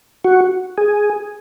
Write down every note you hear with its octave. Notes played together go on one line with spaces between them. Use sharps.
F#4
G#4